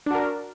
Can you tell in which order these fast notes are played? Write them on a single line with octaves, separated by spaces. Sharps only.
D4 F#4 A#4